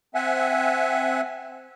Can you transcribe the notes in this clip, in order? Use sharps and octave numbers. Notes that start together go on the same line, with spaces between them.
C4 E5 F#5 G#5